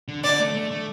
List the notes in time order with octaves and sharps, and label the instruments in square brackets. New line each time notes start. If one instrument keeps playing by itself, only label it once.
[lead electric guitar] D3
[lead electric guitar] D3 [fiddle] D5
[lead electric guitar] A3
A3
A3